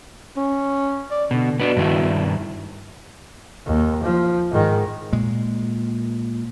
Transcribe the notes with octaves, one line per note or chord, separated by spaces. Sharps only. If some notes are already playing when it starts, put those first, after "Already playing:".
C#4
D5
B2 D3
B2 B3 D4
G2 D#3 E4
D#2
F3
G#2 D#3
A#2 G#3